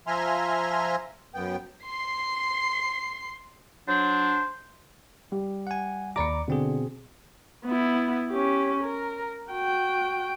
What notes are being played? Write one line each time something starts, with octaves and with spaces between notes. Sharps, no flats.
F3 E5 G#5 A#5 C6 F6
F#2 B3 G5
C6 C7
F#3 D4 C5
G3
F#5 G#5
D#2 D5 A#5 B5 D6 C#7
B2 D3 C4 G#4
B3 E4
C#4 G4
A#4
F#4 G5